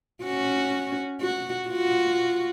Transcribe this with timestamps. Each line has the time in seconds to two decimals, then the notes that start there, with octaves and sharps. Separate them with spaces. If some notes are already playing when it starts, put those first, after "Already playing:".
0.24 C#4 F#4
1.21 F#4
1.69 F4 F#4